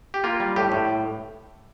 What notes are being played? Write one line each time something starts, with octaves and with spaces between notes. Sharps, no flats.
G4
A#3 F4
G3
A2 G4
A2